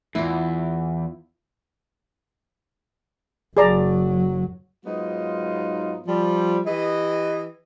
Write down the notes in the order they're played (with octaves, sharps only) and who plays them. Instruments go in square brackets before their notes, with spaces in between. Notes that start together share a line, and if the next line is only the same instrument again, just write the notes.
[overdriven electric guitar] E2 [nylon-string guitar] E4 F4
[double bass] F#1 F#3 [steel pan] G#4 D5 A#5
[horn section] G#2 F#3 B3 D#4 F4
F3 G3
E3 G4 B4 D#5